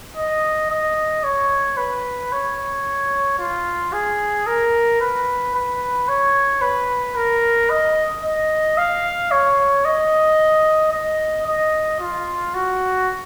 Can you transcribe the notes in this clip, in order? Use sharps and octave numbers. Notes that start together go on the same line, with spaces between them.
D#5
D#5
C#5
B4
C#5
F4
G#4
A#4
B4
B4
C#5
B4
A#4
D#5
D#5
F5
C#5
D#5
D#5
D#5
F4
F#4